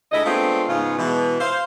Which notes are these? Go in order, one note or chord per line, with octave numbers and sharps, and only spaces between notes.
D2 G#3 E4 D#5
G#3 A3 B3 C4 D4 F4
G#2 C#3 B3 F4
B2 E3 G#3
C5 F5